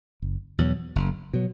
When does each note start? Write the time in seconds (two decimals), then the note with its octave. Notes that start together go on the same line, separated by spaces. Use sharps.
0.22 F#1
0.58 E2 B2 F#3
0.96 F#1
1.33 B2 F#3